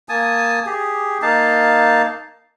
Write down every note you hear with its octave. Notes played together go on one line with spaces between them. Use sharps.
A#3 G#5 A5 D#6
G4 G#4
A#3 D#4 F5 A5